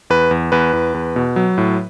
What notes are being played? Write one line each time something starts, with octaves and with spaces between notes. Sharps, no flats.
E2 B4
E2
E2 B4
E2
E2
B2
F#3
A2